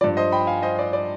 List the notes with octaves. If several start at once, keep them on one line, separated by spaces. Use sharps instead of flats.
G2 F3 D5
C5 D#5
G5 B5
F5 G#5
C5 D#5
D5
D5